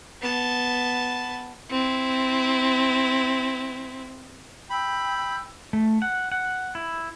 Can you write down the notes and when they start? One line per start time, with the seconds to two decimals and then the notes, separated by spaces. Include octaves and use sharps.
0.22 B3 A5
1.70 C4 E4
4.70 G5 B5 E6 G6
5.73 A3
6.02 F#5
6.32 F#5
6.75 E4